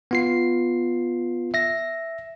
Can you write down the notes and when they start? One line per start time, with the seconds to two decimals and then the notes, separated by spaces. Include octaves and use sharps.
0.11 B3 F4 C7
1.54 E5 A#6